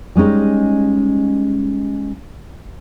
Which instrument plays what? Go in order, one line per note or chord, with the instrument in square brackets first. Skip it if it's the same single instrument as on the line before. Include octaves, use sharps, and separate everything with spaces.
[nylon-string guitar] G3 G#3 C#4 D#4